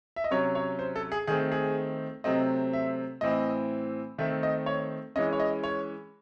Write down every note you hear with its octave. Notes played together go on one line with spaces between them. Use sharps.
E5
D#5
C3 F#3 C#4 C#5
C#5
C5
A4
G#4
D#3 A3 C4 G#4
G#4
C3 F#3 A3 C4 D#5
E5
A2 E3 C4 D#5
D#3 A3 C4 E5
D#5
C#5
E3 G#3 C#4 D#5
C#5
D#5
C#5